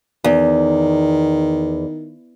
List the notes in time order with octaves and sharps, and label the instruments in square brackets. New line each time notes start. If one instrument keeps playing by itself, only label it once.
[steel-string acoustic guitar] E2 [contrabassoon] D#3